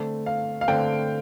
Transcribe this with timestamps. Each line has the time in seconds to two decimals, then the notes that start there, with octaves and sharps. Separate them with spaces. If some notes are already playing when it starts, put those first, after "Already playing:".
Already playing: D3 A3 C4
0.26 F5
0.61 F5
0.68 D3 A3 C4 G5